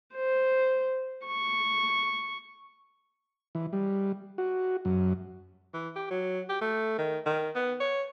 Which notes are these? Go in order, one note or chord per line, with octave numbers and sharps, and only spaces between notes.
C5
C#6
E3
G3
F#4
F#2
E3
G4
F#3
G4
A3
D#3
D#3
B3
C#5